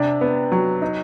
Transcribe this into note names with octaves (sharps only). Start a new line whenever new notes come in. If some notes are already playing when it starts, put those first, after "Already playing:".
Already playing: C3 D4
B3
F#3
D#4